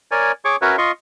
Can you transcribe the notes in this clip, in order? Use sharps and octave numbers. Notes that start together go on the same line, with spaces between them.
A#4 C#5 D5 G#5
G#4 C#5 C#6 D6
C#4 F#4 A#4 B4 C#5 E5
F4 D#5 C6 C#6